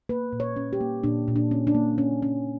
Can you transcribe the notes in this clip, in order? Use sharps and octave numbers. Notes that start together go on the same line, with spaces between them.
A#3 B4
A#2
C#5
C#4
G4
A#3
A#2 D4
A#2
D4
C#4
D4
A#3
C#4
C#4